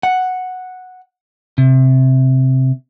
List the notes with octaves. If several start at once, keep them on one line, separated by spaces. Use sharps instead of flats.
F#5
C3